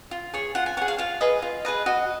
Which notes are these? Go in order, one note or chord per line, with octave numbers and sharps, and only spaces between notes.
F4
G#4 C#5
F4 F#5
G#5
G#4 C#5 F#5
F5
F4 F5
G#4 B4 D#5
F4
G#4 B4 D#5
F#4 D#5